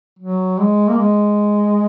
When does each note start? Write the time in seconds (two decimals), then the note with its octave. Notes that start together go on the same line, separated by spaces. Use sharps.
0.19 F#3
0.59 G#3
0.88 A#3
0.98 G#3